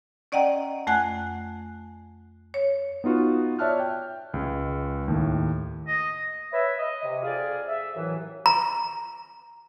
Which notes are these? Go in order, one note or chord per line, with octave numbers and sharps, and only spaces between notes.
C#4 D5 D#5 F#5 G5 A#5
F2 A3 F#5 G#5 F#6
C#5
B3 D#4 F4 F#4
C#5 D5 E5 A5 F6 F#6
G5
C#2 G#3
D#2 A2
D#5
B4 C#5 E5
D#5
C3
F2 F4 G#4 D5
E5
C2 F#2 A2 E3 F#3
A#5